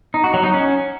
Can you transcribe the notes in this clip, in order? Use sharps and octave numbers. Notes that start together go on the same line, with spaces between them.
D#4
F#4
F#3
D#4
C#4